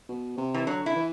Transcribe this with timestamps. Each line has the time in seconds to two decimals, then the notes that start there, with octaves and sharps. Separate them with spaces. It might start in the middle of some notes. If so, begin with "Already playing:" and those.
0.09 B2
0.38 C3
0.54 E3
0.67 D3 F#3
0.86 E4
0.96 E3